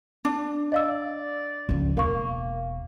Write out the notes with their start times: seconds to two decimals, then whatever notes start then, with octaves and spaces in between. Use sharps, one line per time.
0.25 D4 D6
0.72 D5 D#5 F5 E6
1.69 C#2 F3
1.97 E1 A#3 A#4 F5 C#6